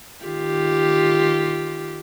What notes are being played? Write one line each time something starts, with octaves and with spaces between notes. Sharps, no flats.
D#3 F4 G4